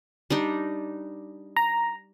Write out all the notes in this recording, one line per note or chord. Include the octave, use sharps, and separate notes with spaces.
G3 D4 D#4
A#5